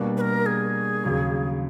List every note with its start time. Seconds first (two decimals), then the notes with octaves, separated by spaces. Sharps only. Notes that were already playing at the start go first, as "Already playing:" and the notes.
Already playing: B2 G3 A#3 D4 F#4
0.17 B4
0.21 A#4
0.46 G#4
1.04 D#2 C#3 F#3